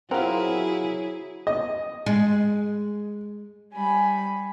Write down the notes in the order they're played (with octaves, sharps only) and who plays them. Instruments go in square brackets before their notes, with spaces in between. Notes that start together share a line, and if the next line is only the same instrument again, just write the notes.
[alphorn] F#3 [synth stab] C4 F4 [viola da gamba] E4 G#4 [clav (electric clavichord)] A#4 F#5
[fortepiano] D#5
[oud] G#3
[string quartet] G3 G#5 B5